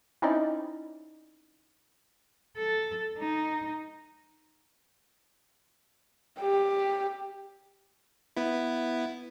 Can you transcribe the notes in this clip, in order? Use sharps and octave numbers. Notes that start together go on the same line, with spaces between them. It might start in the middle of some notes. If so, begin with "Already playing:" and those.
C4 C#4 D#4 E4 D5 D#5
A4
D#4
G4
B3 E4